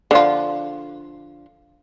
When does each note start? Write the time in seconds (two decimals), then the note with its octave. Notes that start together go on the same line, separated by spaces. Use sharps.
0.11 D3 F3 F4